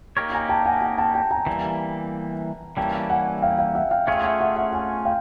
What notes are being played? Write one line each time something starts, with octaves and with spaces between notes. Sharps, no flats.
A#3 D#4 G4 A#4 C#5
G#5 A#5
G5 A5
F#5 G#5
F#5 G#5
G5 A5
G5 A5
G#5 A#5
E3 G3 A#3
E3 G3 A#3 C#4 G5 A5
F#5 G#5
F5 G5
F5 G5
E5 F#5
F5 G5
A3 C#4 F4 G#4 C#5 F5 G5
E5 F#5
E5 F#5
E5 F#5
F#5 G#5
F5 G5